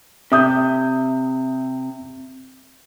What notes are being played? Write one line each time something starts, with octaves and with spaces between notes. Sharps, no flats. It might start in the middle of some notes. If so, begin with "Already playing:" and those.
C3 E5 D#6 G6